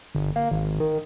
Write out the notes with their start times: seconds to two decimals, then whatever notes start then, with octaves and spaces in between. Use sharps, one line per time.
0.15 G1
0.36 A#3
0.51 G#1
0.80 D#3